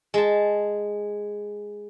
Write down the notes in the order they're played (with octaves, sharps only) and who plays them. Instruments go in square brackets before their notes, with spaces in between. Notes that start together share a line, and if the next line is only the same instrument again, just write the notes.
[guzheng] G#3 A5